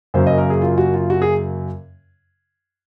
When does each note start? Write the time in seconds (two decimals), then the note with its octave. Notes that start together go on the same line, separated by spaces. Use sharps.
0.14 F#2 C#3 F#3 A#3 C5
0.27 D#5
0.38 A#4
0.50 G#4
0.62 F4
0.78 F#4
0.94 F4
1.10 F#4
1.22 G#4